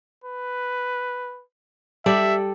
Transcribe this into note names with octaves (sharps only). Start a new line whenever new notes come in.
B4
G3 A4 D5 E5